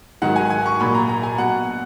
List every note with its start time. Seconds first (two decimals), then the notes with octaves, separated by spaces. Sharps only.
0.22 G#2 D#3 F#3 F#5
0.36 G#5
0.50 G#5
0.66 C#6
0.80 A#2 F#3 B5
0.95 A#5
1.09 A#5
1.23 G#5
1.38 B2 F#3 F#5